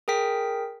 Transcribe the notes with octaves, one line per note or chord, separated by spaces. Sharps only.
G#4 A#4 G5 B6